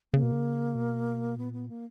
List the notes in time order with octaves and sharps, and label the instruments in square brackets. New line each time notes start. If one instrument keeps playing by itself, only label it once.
[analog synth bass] C#3 [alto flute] A#3
[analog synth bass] B2
C#3
B2
[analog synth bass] A#2 [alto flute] B3
[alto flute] B3
A#3